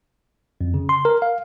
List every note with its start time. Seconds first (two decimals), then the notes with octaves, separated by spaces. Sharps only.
0.61 F2
0.74 C#3
0.89 C6
1.05 A#4
1.22 F5